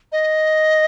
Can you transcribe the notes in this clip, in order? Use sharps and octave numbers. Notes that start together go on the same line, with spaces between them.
D#5